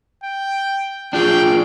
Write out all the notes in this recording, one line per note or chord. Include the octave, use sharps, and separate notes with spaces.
G5
D4 F4 G#4 G5